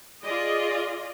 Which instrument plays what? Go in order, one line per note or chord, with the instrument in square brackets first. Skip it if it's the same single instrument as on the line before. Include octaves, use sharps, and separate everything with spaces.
[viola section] F4 G#4 D5 D#5